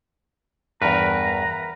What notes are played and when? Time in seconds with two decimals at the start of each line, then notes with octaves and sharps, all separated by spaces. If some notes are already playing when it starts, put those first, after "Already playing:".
0.82 E2 G2 A#4 B4 A#5